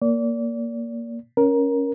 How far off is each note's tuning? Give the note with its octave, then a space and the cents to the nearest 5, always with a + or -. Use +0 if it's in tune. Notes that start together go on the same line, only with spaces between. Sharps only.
A#3 +0 D5 -30
C#4 +0 A#4 +15